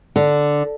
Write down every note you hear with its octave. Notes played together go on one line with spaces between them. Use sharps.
D3